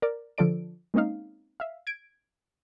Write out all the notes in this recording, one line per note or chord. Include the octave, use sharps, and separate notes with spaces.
A#4 D5
D3 F3 F4 A4 D5 D7
G#3 A#3 C4 C#4 D#4 F5
E5 F5
G#6 D7